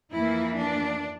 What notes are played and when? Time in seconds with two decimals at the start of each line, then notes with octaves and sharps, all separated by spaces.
0.12 F2 E3 A#3 E4
0.57 D4